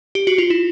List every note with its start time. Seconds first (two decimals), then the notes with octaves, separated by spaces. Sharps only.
0.15 G4
0.27 F#4
0.38 F4
0.50 E4